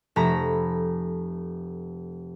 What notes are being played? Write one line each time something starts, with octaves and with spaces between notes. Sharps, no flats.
F1 A3 A#5 B5 A#6